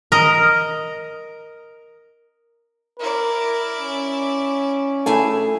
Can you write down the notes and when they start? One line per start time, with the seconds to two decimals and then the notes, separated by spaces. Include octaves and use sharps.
0.12 A#4 D#5
3.00 E4 A#4 D5
3.79 C#4
5.06 A3 E4 G#4 G#5